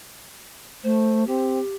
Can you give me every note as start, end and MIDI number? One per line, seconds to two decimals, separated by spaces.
0.84 1.26 57
0.84 1.24 72
1.27 1.59 60
1.27 1.76 67